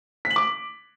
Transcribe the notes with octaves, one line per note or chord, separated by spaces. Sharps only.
B6
F#7
D6